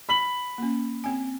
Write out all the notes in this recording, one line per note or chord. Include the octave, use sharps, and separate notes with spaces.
B5 B6 F#7
A#3 C#4
C4 G#5